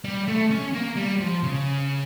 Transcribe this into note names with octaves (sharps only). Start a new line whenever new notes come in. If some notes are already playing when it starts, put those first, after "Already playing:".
G3
A3
C#4
A#3
G3
F3
C#3